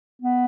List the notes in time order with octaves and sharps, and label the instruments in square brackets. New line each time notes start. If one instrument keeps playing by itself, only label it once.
[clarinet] B3